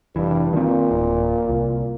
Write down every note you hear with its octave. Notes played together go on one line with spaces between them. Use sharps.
F1 G2 E3
A#2 D#3 C4
D1
C2